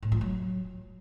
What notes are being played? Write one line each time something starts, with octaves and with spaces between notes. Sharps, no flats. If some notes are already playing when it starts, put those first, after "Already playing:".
A2
F3
F#3